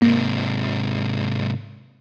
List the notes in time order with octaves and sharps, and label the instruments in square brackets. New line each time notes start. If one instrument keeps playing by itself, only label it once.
[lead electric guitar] G#2 C3 [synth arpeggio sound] A#3